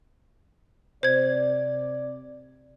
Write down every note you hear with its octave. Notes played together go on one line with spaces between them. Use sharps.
C3 C5 D5 G#6